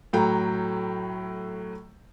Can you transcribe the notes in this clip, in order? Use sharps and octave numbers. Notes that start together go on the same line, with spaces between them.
A2 F#3 A3 G5 A#5